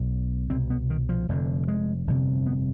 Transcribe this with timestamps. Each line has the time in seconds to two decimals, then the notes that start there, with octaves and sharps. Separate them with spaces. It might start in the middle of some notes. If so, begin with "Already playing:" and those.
Already playing: B1 B2
0.50 C2 B2 C4
0.70 B3
0.90 D#3
1.09 F3
1.29 F1 F2 D3
1.68 G#3
2.07 G1 F2 C3
2.46 B3